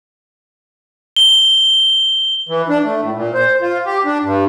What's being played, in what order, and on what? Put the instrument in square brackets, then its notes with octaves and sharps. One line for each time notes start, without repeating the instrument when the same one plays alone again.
[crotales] G7
[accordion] E3
D4
A3
A2
A#2
C5
F4
G4
D4
G2